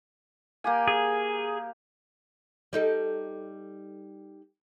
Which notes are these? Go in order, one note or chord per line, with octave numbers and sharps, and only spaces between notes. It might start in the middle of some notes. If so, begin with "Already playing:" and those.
A#3 G4 G#5
G#4
G3 D#4 A4